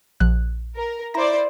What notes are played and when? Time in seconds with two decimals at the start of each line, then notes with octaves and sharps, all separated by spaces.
0.20 A#1 F#6
0.76 A#4
1.14 E4 C5 D5 A#5 A#6